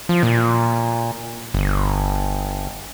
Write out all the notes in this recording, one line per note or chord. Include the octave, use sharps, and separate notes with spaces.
F3
A#2
G1